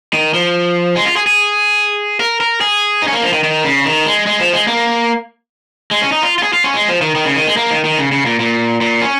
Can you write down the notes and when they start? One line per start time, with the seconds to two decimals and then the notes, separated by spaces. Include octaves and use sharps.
0.13 D#3
0.34 F3
0.95 G#3
1.06 F4
1.16 G#4
1.27 G#4
2.20 A#4
2.40 A#4
2.61 G#4
3.02 D#4
3.08 C#4
3.13 A#3
3.23 F3
3.33 D#3
3.44 D#3
3.65 C#3
3.85 D#3
4.06 G#3
4.27 G#3
4.40 F3
4.53 G#3
4.68 A#3
5.91 G#3
6.02 C#4
6.12 D#4
6.23 F4
6.38 F4
6.43 G#4
6.53 F4
6.64 C#4
6.74 G#3
6.88 F3
7.02 D#3
7.16 D#3
7.25 C#3
7.36 D#3
7.47 G#3
7.57 A#3
7.71 D#3
7.85 D#3
7.98 C#3
8.12 C#3
8.26 A#2
8.40 A#2
8.81 A#2
9.01 C#4